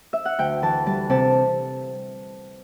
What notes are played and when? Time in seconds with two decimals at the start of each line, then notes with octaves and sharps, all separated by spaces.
0.13 E5
0.25 F#5
0.39 D2 G5
0.62 E3 A5
0.86 G3 A5
1.10 C3 A5